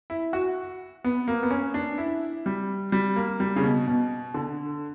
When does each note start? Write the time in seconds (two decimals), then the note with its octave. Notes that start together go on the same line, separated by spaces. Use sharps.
0.10 E4
0.33 F#4
1.04 B3
1.28 A#3
1.43 B3
1.51 C#4
1.74 D4
1.98 E4
2.46 G3
2.92 G3
3.16 A#3
3.40 G3
3.56 C#3
3.63 B2
3.87 B2
4.34 D3